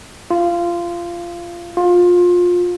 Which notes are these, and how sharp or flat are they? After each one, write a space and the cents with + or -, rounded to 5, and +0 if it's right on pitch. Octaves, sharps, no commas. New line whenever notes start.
F4 -20
F4 +20